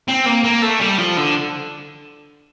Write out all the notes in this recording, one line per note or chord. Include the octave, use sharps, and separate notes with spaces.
C4
A#3
A#3
A3
G3
F3
D3